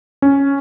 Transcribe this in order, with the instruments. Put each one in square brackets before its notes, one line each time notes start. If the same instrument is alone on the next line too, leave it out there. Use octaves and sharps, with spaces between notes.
[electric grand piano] C#4